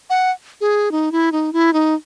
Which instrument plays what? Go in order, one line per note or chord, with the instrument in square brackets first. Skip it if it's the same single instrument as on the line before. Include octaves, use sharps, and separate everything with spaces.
[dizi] F#5
G#4
D#4
E4
D#4
E4
D#4